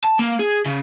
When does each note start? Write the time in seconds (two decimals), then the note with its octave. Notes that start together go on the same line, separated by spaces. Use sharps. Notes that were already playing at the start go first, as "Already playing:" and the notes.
0.04 A5
0.19 A#3
0.39 G#4
0.66 C#3